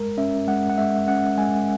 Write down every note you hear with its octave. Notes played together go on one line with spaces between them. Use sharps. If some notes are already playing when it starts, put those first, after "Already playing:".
Already playing: G#3 A#4
C#4 E5
G#3 F#5
F#5
G#3 E5
C#4 F#5
G#3 G#5